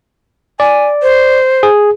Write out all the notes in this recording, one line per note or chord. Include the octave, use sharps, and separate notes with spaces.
D5 G#5
C5
G#4